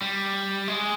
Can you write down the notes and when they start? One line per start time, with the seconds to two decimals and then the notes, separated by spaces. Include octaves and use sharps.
0.02 G3
0.68 G#3